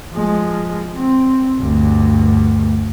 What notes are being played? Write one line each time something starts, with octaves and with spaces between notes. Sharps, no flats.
F3 G#3
C4
D2 G2